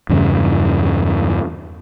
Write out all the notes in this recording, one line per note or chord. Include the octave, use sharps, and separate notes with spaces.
E2 G2 C#3